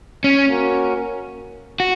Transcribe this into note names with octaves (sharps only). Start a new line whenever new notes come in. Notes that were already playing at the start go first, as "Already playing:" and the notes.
C#4
A#3 C#4 F#4 A#4
F#4